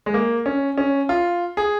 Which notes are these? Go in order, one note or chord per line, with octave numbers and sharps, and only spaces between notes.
G#3
A#3
C#4
C#4
F4
G#4